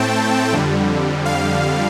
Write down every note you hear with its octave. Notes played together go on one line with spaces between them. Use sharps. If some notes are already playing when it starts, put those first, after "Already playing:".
Already playing: A2 A3 C4 G5 A5
F2 D3 G3
F5